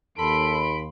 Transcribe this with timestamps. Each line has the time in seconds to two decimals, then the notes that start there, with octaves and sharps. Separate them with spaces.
0.19 D#2 A4 B5 C6 D7